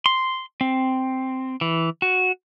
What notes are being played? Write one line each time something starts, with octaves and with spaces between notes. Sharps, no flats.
C6
C4
E3
F#4